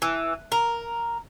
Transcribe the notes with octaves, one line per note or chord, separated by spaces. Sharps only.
E3
A#4